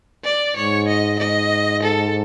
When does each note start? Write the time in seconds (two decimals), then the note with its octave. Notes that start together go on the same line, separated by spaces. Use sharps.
0.25 D5
0.56 G#2 C#5
0.88 D#5
1.19 G#2 D#5
1.83 A4